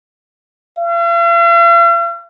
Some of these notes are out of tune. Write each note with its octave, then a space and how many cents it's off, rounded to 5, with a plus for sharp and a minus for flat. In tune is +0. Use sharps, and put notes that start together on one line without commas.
F5 -45